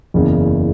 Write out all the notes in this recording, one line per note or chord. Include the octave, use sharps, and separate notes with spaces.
F#1 E2 C#3